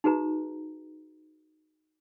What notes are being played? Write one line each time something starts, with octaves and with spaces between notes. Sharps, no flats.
D#4 F#4 G#4 B4 A#5